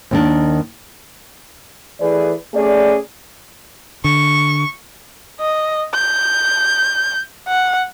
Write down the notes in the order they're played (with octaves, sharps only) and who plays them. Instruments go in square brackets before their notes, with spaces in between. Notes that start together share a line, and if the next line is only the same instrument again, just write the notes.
[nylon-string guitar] D#2 D#3 D4
[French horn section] E3 A3 G#4 B4 D5
A3 C#4 G#4 D5
[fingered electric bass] D3 [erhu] C#6
[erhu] D#5
G6
F#5